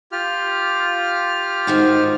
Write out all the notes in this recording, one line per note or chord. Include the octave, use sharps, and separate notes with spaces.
F4 G4 F6
G#2 D#3 F#4